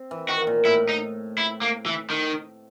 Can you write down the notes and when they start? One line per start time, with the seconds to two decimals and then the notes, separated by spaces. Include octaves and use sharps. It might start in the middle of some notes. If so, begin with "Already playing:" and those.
Already playing: C4
0.11 E3
0.28 D#3 F#4
0.47 A#2
0.65 A2 E4
0.89 D#4
1.38 E4
1.62 A#3
1.86 E3
2.10 D#3